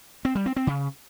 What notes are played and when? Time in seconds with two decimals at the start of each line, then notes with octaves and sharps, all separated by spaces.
0.25 C4
0.35 G3
0.46 C4
0.56 C4
0.67 C#3